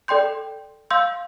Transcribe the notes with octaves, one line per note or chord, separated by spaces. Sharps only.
A4 D5 G5 C6 G6
F5 C6 E6 G6